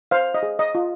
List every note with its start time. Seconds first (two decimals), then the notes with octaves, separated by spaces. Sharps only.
0.11 C5 F5
0.34 D#5
0.43 G#4
0.59 D#5
0.75 F4